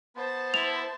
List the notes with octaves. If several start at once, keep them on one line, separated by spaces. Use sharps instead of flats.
B3 C5 A5
E4 F7